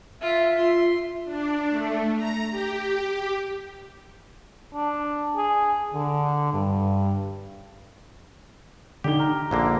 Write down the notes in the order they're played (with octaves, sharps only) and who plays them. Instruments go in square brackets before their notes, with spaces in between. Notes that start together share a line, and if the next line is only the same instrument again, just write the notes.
[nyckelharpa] F4 [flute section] E5
[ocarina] F4 [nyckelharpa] C6
[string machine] D4
A3
A#5
G4
[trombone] D4
G#4
D3
G2
[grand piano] D3 D#4 G7 [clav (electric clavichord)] G4
[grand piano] A#5 F6
[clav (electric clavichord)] A#1 D3 A#3